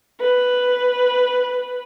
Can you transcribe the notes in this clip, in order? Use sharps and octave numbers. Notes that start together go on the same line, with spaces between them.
B4